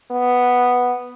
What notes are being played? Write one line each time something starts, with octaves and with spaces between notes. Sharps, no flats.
B3